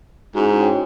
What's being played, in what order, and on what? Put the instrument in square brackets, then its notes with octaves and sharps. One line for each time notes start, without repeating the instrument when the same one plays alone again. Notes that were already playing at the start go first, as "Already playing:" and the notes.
[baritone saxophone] G#2 [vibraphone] C#4 E4 F#4
[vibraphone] C#5 G5